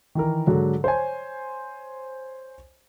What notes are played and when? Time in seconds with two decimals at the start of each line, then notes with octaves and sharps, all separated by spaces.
0.15 D#3 E3 A#4
0.47 G#2 D3 F#3
0.84 C5 C#5 G#5